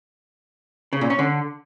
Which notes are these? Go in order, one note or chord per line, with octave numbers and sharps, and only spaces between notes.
C#3
A#2
C#4
D3